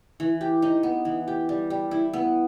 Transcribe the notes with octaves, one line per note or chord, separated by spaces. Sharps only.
E3
G4
D#4
B3
E3
G4
G3
G3
E4
B3